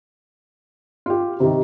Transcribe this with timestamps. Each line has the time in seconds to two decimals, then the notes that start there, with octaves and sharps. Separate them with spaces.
1.06 F4 G4
1.40 C3 D#3 G4